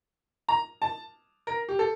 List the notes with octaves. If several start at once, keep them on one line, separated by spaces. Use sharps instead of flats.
A#5
A5
A#4
G4
A4